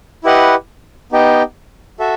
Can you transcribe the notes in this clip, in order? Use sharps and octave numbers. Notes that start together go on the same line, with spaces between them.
E4 G4 B4 D#5 F#5
B3 D#4 G4 D#5 G5
F#4 A4 E5